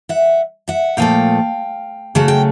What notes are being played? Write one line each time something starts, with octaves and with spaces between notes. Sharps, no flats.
E5 F#5
E5 F#5
A#2 F3 A3 F5 G5
C#3 F#3 A3 F#5
G5